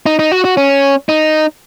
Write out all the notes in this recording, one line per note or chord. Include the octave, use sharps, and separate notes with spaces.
D#4
D#4
F#4
F#4
C#4
D#4